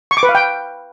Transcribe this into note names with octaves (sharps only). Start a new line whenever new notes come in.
C#6
D6
B4
F5
G5